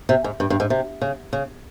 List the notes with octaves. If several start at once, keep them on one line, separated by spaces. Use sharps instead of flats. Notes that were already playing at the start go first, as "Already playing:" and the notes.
C3
G#2
G2
G2
G#2
C3
C#3
C#3